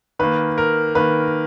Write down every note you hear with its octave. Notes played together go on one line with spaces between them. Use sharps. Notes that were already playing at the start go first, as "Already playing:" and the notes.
D#3 A#3 B4
A#4
D#3 A#3 B4